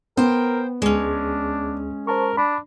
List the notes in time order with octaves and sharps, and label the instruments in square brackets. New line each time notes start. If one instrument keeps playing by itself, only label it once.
[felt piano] B3 [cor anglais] A#4 [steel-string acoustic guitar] C5 G5
[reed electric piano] D2 G#4 [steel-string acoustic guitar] G#3 C#4 [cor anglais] D4
[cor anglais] A#4 [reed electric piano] C5 A5 C#6
[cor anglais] D4 [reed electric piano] B5